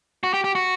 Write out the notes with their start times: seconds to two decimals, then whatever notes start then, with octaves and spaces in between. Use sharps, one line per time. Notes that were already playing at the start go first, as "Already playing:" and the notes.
0.23 F#4
0.34 G4
0.44 G4
0.55 F#4